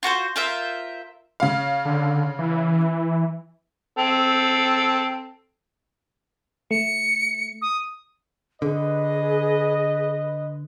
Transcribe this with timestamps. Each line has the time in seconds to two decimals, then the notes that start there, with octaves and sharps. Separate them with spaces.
0.03 F4 F#4 B4 C5
0.36 F4 A#4 C5 E5
1.40 C#3 F5
1.85 D3
2.39 E3
3.98 C4 A4
6.71 A3 C#7
7.62 D#6
8.62 D3 G#4 B4 D#5